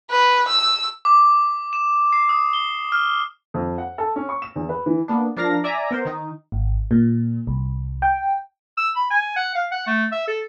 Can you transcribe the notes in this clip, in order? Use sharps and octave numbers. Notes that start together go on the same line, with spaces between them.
B4
E6
D6
E7
C7
D#6
G7
F6
F2
F#5
A4
C#4
C#6
E7
E2
B4
E3
A#3 B3 D4
F3 D4 A#4 F5 A#6
D5 E5 G#5 A#5
B3 A#4 C5
D#3 D#4
G#1
A#2
C2
G5
E6
B5
G#5
F#5
F5
F#5
A3
E5
A4